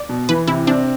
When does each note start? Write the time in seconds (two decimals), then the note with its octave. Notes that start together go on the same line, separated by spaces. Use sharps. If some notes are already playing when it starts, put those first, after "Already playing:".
Already playing: D5
0.09 B2
0.29 E3 B4
0.47 C3 E4
0.67 C4 D4